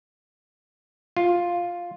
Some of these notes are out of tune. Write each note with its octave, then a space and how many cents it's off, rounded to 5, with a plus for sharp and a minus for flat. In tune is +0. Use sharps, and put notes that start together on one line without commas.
F4 +5